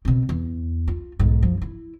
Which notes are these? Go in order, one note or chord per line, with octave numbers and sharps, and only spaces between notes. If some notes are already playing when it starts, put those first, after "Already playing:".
B2 C4
E2
F4
B1 G#2
F#2 F3
E4